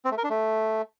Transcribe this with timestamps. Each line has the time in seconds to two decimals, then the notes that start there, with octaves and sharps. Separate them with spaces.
0.05 C4
0.11 A3
0.17 A#4
0.24 D4
0.30 A3